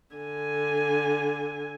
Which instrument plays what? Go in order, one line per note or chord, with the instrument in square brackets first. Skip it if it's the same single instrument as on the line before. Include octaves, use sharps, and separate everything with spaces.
[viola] D3 G#5